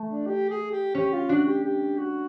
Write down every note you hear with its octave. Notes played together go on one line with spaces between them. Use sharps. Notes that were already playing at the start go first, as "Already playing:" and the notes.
Already playing: A3
D4
G4
G#4
G4
C#4 G4
F4
D4 F#4
G4
G4
F#4